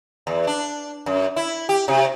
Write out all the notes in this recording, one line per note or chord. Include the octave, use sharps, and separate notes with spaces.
E2
D4
F#2
E4
G4
C3